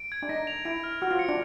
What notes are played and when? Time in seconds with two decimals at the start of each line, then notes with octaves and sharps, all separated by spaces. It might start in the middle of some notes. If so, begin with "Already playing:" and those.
Already playing: D7
0.12 G#6
0.23 D4
0.29 D#4 A#6
0.47 F7
0.65 E4 D7
0.84 F6
1.01 F#4 F6
1.11 F4
1.19 C#7
1.29 D4